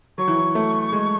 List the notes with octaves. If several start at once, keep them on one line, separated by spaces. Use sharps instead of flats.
F#3 C#6
E3
F#3
A3
G#3